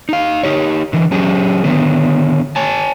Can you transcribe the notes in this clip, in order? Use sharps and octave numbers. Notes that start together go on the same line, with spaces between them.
D#4 F5
D#4 G4 C#5
D3 E3
F#3 C#4 G4 G#4
D3 D#3 B3
C#5 G#5 A5